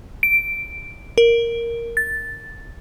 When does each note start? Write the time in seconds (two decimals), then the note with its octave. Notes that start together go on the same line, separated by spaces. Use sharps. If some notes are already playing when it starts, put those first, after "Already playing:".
0.23 D7
1.18 A#4
1.97 A6